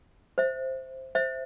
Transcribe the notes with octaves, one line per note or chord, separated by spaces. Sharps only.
C5 E5
C5 E5